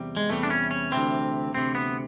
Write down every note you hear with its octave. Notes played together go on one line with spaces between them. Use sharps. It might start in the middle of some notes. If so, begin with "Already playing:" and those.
Already playing: E2 C3 G3
G#3
E2 C3 E3 G3 A3
D4
C#4
C#4
D2 C3 E3 C4
D2 C3 E3 C4
B3